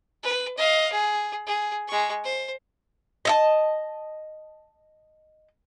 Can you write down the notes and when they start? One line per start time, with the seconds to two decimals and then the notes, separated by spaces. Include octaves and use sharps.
0.23 B4
0.57 D#5 F5
0.92 G#4
1.46 G#4
1.87 G#3 C#6
2.24 C5
3.25 D#5 E5 A5